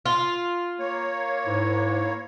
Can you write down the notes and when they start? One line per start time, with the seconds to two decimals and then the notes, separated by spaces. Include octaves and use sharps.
0.06 F4
0.79 A#3 C#5
1.46 G#2 E4